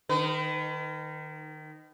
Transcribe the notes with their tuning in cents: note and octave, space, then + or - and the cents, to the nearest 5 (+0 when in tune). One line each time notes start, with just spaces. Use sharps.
D#3 -15 B4 +40